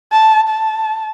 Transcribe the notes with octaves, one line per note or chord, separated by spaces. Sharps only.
A5
A5